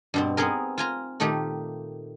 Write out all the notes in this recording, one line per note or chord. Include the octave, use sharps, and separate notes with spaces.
G2 B2 C4
B3 C4 D#4 G#4 A#4
F4 G#5 A#5
A#2 D#3 A3 D#4 G4